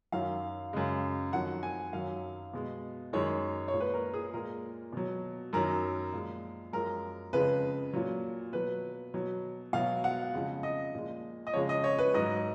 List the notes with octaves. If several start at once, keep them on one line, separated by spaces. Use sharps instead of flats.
F#2 D#3 F#3 F5
F#2 C#3 G#3
F2 D#3 F#3 F#5
G#5
F#2 D#3 F#3 F5
B2 G#3
F#2 D#3 G#3 C#5
C#5
A#2 G#3
B4
A#4
G#4
A#2 G#3 A#4
B2 F#3
F#2 D#3 F#3 A#4
A#2 F3 G#3
F#2 F3 G#3 A#4
F2 C#3 G#3 B4
A#2 F#3
B2 F#3 B4
B2 F#3
B2 F#3 F5
F#5
F2 C#3 G#3
D#5
A#2 F3 G#3
D#5
F2 C#3 F3 G#3 C#5
D#5
C#5
B4
G#2 F#3 D#5